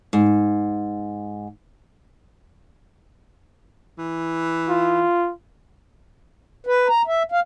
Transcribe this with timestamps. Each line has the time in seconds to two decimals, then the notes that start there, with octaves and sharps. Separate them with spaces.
0.13 G#2
3.98 E3
4.69 F4
6.67 B4
6.89 A#5
7.07 E5
7.32 F5